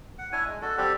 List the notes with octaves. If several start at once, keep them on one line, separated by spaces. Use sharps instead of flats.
F#5
D4 E4 C#5 G#5
G#3
D4 F#4 A4
G3 C4 G4 A4